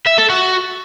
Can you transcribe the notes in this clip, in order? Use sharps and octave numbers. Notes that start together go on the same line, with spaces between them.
E5
A4
F#4